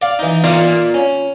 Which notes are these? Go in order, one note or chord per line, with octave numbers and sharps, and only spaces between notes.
D5 F5
E3 D#4
F4 D5 F5
C#4